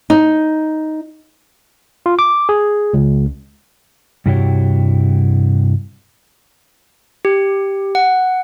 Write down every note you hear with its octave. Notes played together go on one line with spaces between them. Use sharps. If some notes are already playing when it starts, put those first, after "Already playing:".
D#4
F4
D6
G#4
C#2
G2 C3 E4 F#4 G4 C#5
G4
F#5